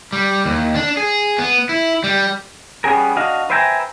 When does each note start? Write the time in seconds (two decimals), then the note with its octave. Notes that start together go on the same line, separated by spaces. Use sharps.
0.13 G3
0.45 D#2
0.75 D4
0.97 G#4
1.38 B3
1.69 E4
2.04 G3
2.84 G3 B3 C#4 G#4 A#4
3.16 D4 F#4 D#5 F5
3.50 B4 C5 E5 G5 G#5 A#5